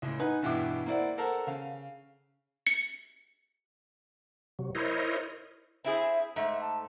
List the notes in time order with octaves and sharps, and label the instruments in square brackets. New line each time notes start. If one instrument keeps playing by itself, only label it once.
[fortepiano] C#2 A2
D#4 B4 F#5 G#5
E2 G2 B2 E4 G5 D6
A#3 C4 E4 D5 F#5
A4 A#4 C5 F#5 A5
C#3 F5
[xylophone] C#7
[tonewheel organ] C3 F#3
E4 A#4 C5 C#5 D#5
[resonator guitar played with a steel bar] C4 E4 G#4 [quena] E5
[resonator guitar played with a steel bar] G#2 A3 [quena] E5
[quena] A5